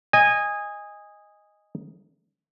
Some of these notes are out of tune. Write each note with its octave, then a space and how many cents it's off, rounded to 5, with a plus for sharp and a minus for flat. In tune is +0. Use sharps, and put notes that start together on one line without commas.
D#5 +0 G#5 -20